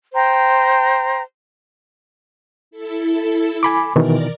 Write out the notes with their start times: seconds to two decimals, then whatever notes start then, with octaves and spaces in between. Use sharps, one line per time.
0.14 C5 G5 A#5
2.71 E4 A4
3.63 G#5 B5 D6
3.96 B2 D#3 E3 A#4 D5